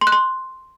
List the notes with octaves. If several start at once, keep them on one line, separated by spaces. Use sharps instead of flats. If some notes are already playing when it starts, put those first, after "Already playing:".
C6
F#6
C6